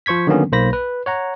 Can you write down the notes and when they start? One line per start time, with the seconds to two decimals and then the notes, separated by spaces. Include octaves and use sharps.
0.06 F3 C5 C#6 G#6 B6
0.27 D3 D#3 F#3 A#3 B3 C#4
0.52 B1 A#3 C5 B5 A#6
0.73 B4
1.06 C#5 F#5 A#5